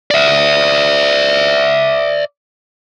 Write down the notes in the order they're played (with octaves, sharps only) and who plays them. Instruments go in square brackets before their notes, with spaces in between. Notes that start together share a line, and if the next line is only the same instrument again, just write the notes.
[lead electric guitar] D5 E5